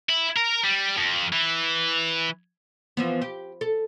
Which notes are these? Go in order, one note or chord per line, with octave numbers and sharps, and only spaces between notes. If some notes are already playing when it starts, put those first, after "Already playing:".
E4
A#4
G3
F2
E3
E3 F3 B3
G4
A4